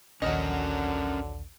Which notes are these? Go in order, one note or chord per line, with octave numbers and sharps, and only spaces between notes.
A#1 D#2 D3 F#3 C#4 A#4 D#5 F#5